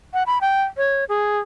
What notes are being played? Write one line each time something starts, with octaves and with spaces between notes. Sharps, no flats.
F#5
B5
G5
C#5
G#4